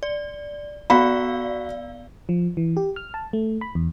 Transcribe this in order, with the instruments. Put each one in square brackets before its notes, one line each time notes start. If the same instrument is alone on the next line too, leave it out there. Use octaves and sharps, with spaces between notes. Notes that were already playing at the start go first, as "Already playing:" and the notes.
[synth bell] D5
[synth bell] B3 D5 F5 [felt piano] F#4 B5
[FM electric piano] F3
E3
G4
F6
A5
A3
B5
E2